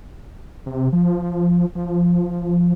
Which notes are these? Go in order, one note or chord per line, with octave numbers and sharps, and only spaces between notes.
C3
F3
F3